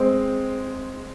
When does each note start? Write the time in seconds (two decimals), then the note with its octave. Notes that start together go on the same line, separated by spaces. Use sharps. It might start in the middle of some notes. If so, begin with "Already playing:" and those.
Already playing: G#3 C4